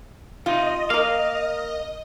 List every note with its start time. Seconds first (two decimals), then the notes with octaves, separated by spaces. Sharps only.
0.46 C3 D#4 F4 D#5
0.90 A#3 A#4 F5